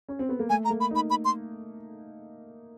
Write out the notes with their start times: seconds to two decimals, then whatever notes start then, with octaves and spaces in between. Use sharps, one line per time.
0.09 C#4
0.19 C4
0.29 B3
0.39 A#3
0.50 A3 G#5
0.65 A#5
0.70 A#3
0.81 B5
0.91 D#4 B5
1.10 B5
1.25 C6